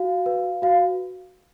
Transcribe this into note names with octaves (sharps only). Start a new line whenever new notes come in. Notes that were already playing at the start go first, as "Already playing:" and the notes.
Already playing: F#4 F5
B4
F#4 F5